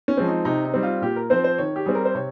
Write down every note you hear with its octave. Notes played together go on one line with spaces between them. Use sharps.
C#4
F3 G#3 C4
D#4
C3 D#4
D#4
G3 C4
F4
A#2 G4
A#4
F3 C4 C5
C5
D#3 C#5
G4
G3 C4 G#4
A#4
C5
C3 C#5